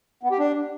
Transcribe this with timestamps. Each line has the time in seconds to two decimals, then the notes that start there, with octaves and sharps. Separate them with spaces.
0.23 B3
0.31 G4
0.39 D4